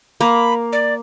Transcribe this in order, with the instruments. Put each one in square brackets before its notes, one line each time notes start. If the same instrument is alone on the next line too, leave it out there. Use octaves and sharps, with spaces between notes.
[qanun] A#3 [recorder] B5
[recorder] D5